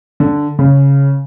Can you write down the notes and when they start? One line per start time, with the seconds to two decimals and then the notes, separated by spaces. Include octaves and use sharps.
0.20 D3
0.59 C#3